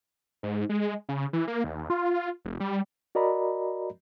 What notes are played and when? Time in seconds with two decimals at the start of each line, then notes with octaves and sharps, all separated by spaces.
0.43 G#2
0.69 G#3
1.09 C#3
1.33 E3
1.48 A#3
1.64 D#2
1.90 F4
2.45 F1
2.60 G3
3.15 F#4 A#4 D5 D#5 A#5 B5